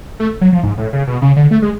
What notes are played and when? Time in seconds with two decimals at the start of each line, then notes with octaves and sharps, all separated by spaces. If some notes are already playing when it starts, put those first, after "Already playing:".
0.20 A3
0.41 F#3
0.52 F3
0.63 G#2
0.78 A2
0.93 C#3
1.07 B2
1.22 C#3
1.37 D3
1.51 A3
1.62 G#3